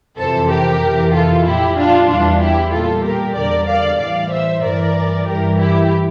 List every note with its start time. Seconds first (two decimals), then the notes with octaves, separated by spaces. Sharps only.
0.18 F2 C3 E3 A4 C5
0.50 G4 A#4
0.82 F2 C3 E3
1.13 F4 A4
1.46 A#2 F3 E4 G4
1.77 D4 F4
2.08 E2 E3 G3 D4 F4
2.41 E4 G4
2.72 A#2 G3 F4 A4
3.04 G4 A#4
3.36 E2 D3 G3 A#4 D5
3.68 D5 F5
4.00 A2 E3 G3 D5 F5
4.32 C5 E5
4.63 G2 E3 G3 A#4 D5
5.27 G2 E3 G3 G4 A#4
5.59 E4 G4